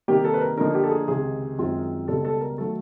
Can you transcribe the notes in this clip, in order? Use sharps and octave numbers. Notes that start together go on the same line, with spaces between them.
C3 D#3 G3 A#3 G4
A4
B4
A#4
D3 F3 A#3 D#4 A#4
G4
A4
G#4
C#2 C3 D#3 G#4
F#2 D#3 G#3 C4 F4
C#2 B2 G3 A4
A4
A#4
D#3 F#3 A3 A4